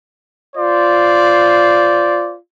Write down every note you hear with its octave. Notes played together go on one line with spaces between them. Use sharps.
F4 C5 D5